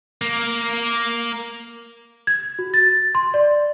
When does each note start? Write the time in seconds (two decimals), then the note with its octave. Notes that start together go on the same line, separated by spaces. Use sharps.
0.22 A#3
2.27 G#6
2.59 F#4
2.74 A6
3.15 C6
3.34 D5